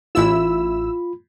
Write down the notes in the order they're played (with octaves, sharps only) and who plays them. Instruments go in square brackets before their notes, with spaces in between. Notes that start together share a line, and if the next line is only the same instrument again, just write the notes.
[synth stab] A1 E4 E6 [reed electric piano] F4 B5